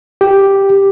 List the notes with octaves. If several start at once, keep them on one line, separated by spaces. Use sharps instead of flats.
G4